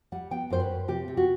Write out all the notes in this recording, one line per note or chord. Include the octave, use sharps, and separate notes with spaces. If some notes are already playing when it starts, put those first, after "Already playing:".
G3 F#5
B3 G5
F#2 C5
B4
F#2
C3 G4
C3
F#4